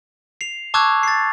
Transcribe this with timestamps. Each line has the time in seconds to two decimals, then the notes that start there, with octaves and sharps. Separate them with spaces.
0.41 C7 F7
0.74 A5 C#6 D6 E6 F#6 G#6
1.03 A6 C7